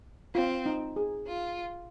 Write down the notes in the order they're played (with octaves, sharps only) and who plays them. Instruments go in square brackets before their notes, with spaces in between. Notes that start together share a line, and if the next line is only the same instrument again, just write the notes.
[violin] C4 [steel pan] F4
[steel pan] D#4
G#4
[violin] F4